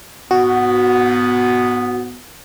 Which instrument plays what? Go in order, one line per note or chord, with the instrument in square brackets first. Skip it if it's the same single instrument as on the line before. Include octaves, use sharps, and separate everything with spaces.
[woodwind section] G#2 B3 [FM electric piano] F#4